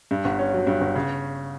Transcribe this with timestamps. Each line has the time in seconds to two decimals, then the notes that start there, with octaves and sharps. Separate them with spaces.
0.11 G2
0.24 G1
0.39 C#4
0.54 F#3
0.67 G2
0.81 G1
0.96 C#3